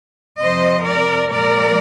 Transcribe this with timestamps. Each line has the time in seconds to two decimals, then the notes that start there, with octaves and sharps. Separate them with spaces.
0.41 F2 C3 F3 C5 D#5
0.85 A#4 D5
1.30 A#2 F3 G#3 A#4 D5